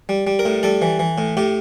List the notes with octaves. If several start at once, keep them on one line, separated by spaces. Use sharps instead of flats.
G3
G3
A#4
A2
G3 A4
E3
E3
A2
A2 G4